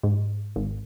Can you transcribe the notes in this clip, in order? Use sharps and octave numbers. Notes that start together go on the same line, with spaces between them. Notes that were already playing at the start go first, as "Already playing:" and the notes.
G#2
G#1